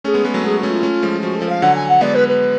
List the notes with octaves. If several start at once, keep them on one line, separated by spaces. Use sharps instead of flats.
A3 C#4 G#4
G#3 B3
G#3 B3
F#3 A3
G#3 B3 G#4
F#4
A3 C#4
F4
A3 C#4
F3 G#3
F3 F#4
A4
F3
F5
D3 F#3 F#5
G#5
F#5
G#3 B3 D5
B4
B4